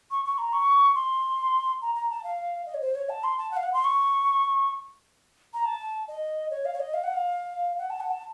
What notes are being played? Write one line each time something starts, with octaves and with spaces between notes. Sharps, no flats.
C#6
C#6
A#5
C#6
C6
A#5
A#5
A5
F5
D#5
C#5
C5
C#5
A5
C6
A5
F#5
F5
F#5
C6
C#6
A#5
A5
D#5
C#5
F5
C#5
D#5
F5
F#5
F5
F#5
A5
F#5
A5